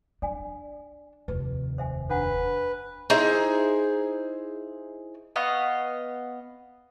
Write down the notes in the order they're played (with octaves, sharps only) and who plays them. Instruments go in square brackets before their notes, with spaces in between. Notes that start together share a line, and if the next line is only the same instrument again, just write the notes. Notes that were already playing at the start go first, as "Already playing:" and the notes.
[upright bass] D4 [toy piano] D5 G#5
[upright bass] F1 D#2 [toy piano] B4
[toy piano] C5 E5 G#5
[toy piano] D4 F#5 A#5 [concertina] B4
[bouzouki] D#4 E4 G#4 C5
[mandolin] B3 D#5 F5 C#6